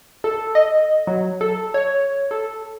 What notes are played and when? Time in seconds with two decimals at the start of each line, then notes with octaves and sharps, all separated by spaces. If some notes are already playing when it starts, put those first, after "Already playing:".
0.24 A4
0.55 D#5
1.07 F#3
1.41 A4
1.74 C#5
2.31 A4